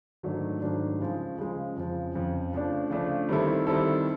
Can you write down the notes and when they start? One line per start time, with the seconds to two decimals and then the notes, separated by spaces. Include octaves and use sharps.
0.23 G#2 D#3 F#3 A3 D4
0.62 G#2 D#3 F#3 A3 D4
0.99 C#3 F3 G#3
1.38 C#3 F3 G#3
1.76 F2 C#3 F3
2.14 F2 C#3 F3
2.53 C#3 F3 A3 D4
2.90 C#3 F3 A3 D4
3.29 D#3 G3 C4 E4 A4
3.67 D#3 G3 C4 E4 A4